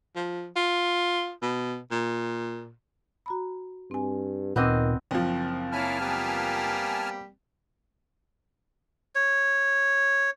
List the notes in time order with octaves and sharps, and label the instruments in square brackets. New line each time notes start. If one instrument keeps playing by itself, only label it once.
[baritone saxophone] F3
F4
B2
A#2
[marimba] F#4 A#5 B5
[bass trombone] G2 [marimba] C4 G#5
[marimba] D2 D6 E6 [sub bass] A#2 [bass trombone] D#3 [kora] B3 C4 D#5
[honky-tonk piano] F#1 F3 [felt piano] C4
[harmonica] A#3 C#4 E4 [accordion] G#5 A5 F6
[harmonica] G3 A#3 B3
[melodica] C#5